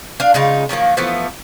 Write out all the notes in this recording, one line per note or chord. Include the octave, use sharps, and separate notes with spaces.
D4 F5
C#3 G#3 D#4 F4
D#3 F3 F#3 A#3
E3 F3 A3 B3